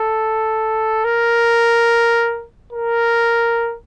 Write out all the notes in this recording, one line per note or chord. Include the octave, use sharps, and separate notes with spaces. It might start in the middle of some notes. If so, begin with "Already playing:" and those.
Already playing: A4
A#4
A#4